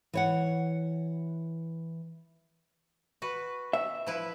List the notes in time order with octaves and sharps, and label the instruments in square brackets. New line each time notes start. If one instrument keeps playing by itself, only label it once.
[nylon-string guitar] E3 C#5 F#5
[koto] F#4 B4
[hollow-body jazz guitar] E5
[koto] F3 E4 B4